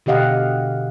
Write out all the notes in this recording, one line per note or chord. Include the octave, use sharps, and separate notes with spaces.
B2 D3 G4 D#5 F5 F#5